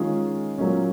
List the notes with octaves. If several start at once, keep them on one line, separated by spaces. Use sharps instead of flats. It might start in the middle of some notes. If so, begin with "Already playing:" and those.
Already playing: D#3 G#3 C#4 F4 G#4
A#2 F#3 A#3 C#4